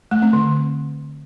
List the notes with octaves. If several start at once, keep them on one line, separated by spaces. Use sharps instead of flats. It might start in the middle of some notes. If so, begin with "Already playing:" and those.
A3
C4
D3